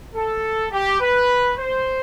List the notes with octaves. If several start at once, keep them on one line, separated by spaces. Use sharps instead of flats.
A4
G4
B4
C5